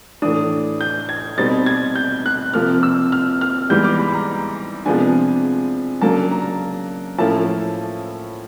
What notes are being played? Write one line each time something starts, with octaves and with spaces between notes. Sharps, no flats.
A2 E3 A3 D4 D#6
G6
G#6
B2 G3 C4 D#4 A6
G#6
G6
F#6
C3 F3 A#3 F6
E6
F6
F6
G#2 E3 G3 B3 G6
D6
B5
A#5
C3 F3 G#3 B3 D4 G#5
C#3 F#3 A#3 D4 A5
A#5
A2 F3 A#3 C#4 E4 A5